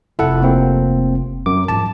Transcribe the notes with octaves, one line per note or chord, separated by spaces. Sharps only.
F1 E4 A4 F#5
A#3 C4
F#2 D6
G#2 F3 A5